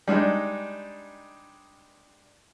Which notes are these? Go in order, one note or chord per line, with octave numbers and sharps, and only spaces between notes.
G3 G#3 D4 D#4